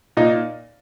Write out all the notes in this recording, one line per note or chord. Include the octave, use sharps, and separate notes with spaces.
A#2 D#4